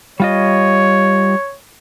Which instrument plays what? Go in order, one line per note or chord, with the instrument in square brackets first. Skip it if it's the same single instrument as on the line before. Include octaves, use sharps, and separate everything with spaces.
[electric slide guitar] G3 F4 D#5 [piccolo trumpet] C#5